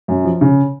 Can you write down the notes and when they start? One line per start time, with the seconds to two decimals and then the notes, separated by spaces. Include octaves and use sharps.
0.08 F#2
0.24 F3
0.41 C#3